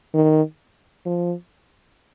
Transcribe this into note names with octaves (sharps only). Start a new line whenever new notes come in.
D#3
F3